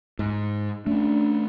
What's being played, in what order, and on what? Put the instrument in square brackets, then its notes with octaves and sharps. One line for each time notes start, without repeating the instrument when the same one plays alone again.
[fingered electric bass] G#2
[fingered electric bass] A3 C#4 [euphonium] D4